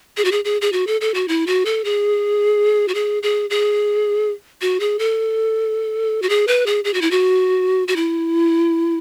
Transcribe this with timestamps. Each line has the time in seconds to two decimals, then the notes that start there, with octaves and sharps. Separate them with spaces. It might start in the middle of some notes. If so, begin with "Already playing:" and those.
0.17 G#4
0.25 F#4
0.32 G#4
0.45 G#4
0.61 G#4
0.72 F#4
0.87 A4
1.01 A4
1.14 F#4
1.28 E4
1.47 F#4
1.65 A4
1.84 G#4
2.88 F#4
2.94 G#4
3.23 G#4
3.50 G#4
4.61 F#4
4.80 G#4
4.99 A4
6.22 F#4
6.29 G#4
6.47 B4
6.66 G#4
6.84 G#4
6.94 F#4
7.01 E4
7.11 F#4
7.88 F#4
7.96 E4